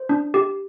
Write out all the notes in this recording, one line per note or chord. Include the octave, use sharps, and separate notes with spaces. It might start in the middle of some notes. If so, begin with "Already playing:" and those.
Already playing: C5
D4
G4